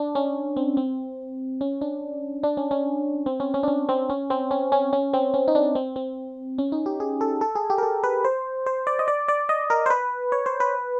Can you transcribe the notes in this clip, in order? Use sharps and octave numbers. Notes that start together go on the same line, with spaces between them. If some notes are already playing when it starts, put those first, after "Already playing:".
Already playing: D4
C#4
C4
C4
C#4
D4
D4
C#4
C#4
C4
C#4
C#4
D4
C#4
C4
C#4
C4
C#4
C#4
C#4
C4
C#4
D#4
D4
C4
C4
C#4
D#4
G4
G#4
A4
A4
G#4
G4
A#4
A4
B4
C5
C5
D5
D#5
D5
D5
D#5
A#4
C5
B4
C#5
C5
B4